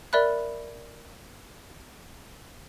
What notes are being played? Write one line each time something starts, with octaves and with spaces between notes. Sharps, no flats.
A#4 D5 E5 B5 F#6